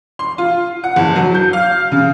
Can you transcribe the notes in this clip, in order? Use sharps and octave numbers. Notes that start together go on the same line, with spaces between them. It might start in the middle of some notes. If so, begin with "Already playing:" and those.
C6
F4
F#5
F#1
F#3
G6
F5
C#3